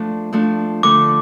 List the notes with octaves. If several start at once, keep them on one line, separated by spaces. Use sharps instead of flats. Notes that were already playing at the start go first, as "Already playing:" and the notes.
Already playing: F3 A3 D4
F3 A3 D4
D3 A3 D4 D6